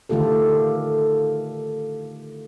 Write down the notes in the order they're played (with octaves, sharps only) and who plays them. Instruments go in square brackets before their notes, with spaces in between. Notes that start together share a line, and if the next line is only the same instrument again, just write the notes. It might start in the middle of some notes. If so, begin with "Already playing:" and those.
[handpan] D3 D#3 A3 F4 G4 A4